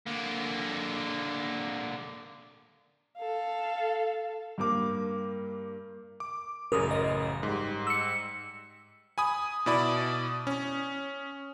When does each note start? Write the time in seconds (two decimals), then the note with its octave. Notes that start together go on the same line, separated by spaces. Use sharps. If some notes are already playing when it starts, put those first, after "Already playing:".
0.06 D3 A#3
3.17 A4 F5
4.58 G2 A#3 D6
6.20 D6
6.72 A1 F#2 C#3 A#4 D#6
6.91 D#5
7.43 G#2 G3
7.87 E6 C#7
9.18 G#5 B5 D#6
9.66 B2 E4 D5 B5 D#6
10.47 C#4